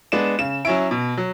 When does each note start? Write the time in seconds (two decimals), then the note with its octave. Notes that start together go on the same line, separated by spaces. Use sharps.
0.12 G#3 B3 D4 E7
0.39 C#3 E7
0.65 F#3 C#4 E4 D7
0.91 B2
1.17 F#3